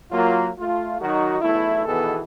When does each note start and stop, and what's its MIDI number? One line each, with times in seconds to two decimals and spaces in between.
0.11 0.49 54
0.11 0.49 58
0.11 0.49 65
0.59 1.00 57
0.59 1.00 65
1.01 1.38 51
1.01 1.38 54
1.01 1.38 63
1.01 1.38 66
1.41 1.82 35
1.41 1.82 40
1.41 1.82 57
1.41 1.82 64
1.85 2.21 47
1.85 2.21 51
1.85 2.21 52
1.85 2.21 59
1.85 2.21 68
1.85 2.21 69